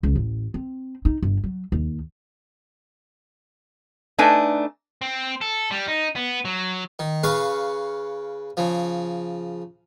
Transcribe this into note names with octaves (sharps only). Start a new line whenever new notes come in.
C#2
A1
C4
D#4
G1
F#3
D#2
A3 D4 D#4 B4 G#5
C4
A4
G3
D#4
B3
F#3
D#3
C#3 B4 F5 C#6
C#3 F3